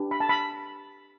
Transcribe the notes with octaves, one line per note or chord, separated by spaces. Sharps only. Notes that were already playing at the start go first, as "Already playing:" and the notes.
Already playing: D4 G4 B4
B5
A5
B5